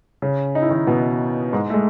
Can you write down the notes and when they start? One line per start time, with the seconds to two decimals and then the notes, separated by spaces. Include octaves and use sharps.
0.22 C#3 C#4
0.55 D#4
0.62 E4
0.69 D#3 D#4
0.87 B2 B3
1.53 G#2 G#3
1.70 A3
1.74 G#3